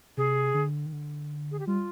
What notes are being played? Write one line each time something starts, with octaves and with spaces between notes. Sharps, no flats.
C3 G#4
D3
D#3
D3
G#4
G4
G3 F4